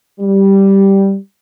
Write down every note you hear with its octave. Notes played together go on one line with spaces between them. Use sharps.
G3